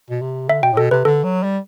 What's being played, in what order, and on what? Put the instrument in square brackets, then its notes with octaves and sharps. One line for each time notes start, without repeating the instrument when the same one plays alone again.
[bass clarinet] B2
C3
[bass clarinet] D3 [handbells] E5
[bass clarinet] B2 [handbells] G5
[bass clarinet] A2
[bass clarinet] B2 [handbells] A4
[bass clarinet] C3 [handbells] B4
[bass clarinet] D3 [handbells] A4
[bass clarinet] F#3
G3